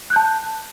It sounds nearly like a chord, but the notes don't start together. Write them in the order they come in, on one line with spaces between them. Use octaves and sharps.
F#6 G6 A5